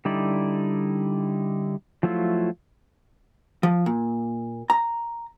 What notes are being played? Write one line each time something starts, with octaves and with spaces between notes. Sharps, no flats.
D3 G3 D#4 E4 D5
F3 F#3 A3 E4 F4
F3
A#2
A#5